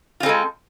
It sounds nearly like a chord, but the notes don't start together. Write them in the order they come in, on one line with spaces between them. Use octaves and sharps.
F4 C4 A4 G#3